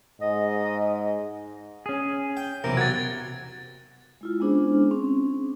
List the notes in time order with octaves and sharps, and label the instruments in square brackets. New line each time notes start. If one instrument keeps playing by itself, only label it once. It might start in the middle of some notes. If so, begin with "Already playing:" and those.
[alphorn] G#2 [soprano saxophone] D#5
[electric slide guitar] C#4 G#4
[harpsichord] G5
[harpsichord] B1 E2 C3 [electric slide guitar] A#4
[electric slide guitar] F#4 [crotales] G#6 A6
[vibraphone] G#3 E4 F4
G#3 B3 C#4 D4 G#4 C5
C4 C#4